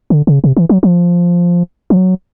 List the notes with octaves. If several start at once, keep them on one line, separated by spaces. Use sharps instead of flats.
D3
C#3
C3
E3
F#3
F3
F3
F#3